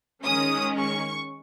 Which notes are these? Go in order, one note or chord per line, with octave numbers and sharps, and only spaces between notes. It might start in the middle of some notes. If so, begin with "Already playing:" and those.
D#3 G#3 C#4 D#6
C#6